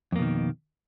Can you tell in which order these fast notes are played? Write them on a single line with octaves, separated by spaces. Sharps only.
F2 A#3 B2 D#3